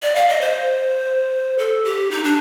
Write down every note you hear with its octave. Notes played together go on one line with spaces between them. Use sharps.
D5
F5
D#5
C5
A4
G4
D#4
D4